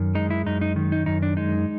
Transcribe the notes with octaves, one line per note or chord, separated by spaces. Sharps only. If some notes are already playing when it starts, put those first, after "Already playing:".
Already playing: F#2 D#3
G#3 D#4
E4
F#2 D#4
D#4
D#3
D#4
F#2 D#4
D4
G#3 D#4